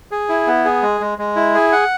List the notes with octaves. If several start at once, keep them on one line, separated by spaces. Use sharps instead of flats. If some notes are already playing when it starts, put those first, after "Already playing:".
G#4
E4
B3
G#4
G#3
G#3
G#3
E4
G#4
F#5